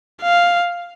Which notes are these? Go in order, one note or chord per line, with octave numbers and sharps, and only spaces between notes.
F5